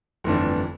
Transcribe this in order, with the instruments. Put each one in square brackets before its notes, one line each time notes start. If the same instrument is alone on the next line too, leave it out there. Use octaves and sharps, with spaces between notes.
[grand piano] G1 F2 E3 A3 D4